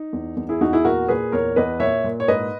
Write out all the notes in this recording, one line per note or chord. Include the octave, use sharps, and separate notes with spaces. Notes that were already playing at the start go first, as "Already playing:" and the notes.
Already playing: D#4
E2
E2
E4 G#4
E2 D#4 F#4
E4 G#4
A#2 F#4 A#4
A#2 G#4 B4
E2 A#4 C#5
E2 B4 D#5
A#2 C#5 E5
A#2
C#5
G#2 B4 D#5